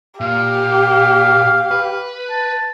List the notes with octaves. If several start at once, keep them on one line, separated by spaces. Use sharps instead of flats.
A#2 G4 F5
B4
A5